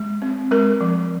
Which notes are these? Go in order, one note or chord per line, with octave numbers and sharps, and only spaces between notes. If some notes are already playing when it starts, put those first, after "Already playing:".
Already playing: G#3
C4
G#3 A#4
F3